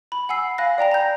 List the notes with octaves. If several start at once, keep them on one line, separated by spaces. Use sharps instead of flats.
B5
F#5 G#5 E6 C7
F5 G#5 B5 F#6 A#6
D5 G5 A#5 A#6
A#5 G6